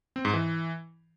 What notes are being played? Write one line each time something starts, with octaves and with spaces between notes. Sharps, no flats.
C4
G#2
E3